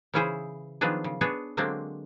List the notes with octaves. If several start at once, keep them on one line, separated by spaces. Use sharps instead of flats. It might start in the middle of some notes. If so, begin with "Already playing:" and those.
C#3 E3 C#4 E4 G#4 C5
D#3 F3 F#3 B3 D4 G#4
C#3
B3 D4 G#4 C#5
D3 F#3 G#3 A#3 C4 D4